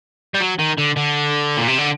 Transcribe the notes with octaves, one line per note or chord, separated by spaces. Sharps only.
G3
F#3
D#3
D3
D3
A#2
C3
D3